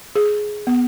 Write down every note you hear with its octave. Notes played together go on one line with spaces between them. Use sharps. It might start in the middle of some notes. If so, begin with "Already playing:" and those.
G#4
B3